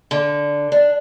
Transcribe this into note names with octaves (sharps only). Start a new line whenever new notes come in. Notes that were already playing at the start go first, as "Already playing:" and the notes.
D3
D4